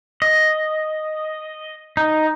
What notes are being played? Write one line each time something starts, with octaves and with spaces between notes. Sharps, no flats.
D#5
D#4